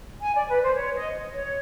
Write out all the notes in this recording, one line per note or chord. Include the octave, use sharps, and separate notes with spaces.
G#5
D5
B4
C5
C#5
D#5
C#5